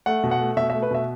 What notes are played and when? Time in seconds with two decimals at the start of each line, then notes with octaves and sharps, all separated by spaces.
0.06 A3 F#5
0.23 B2
0.31 F#5
0.40 A3
0.57 B2 E5
0.70 E5
0.74 A3
0.82 B4
0.91 B2 E5